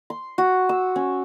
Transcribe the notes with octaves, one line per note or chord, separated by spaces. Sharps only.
C6
F#4
E6
C#4